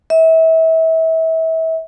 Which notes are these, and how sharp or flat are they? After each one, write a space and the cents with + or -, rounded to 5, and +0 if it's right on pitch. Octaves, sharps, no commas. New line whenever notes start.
E5 -30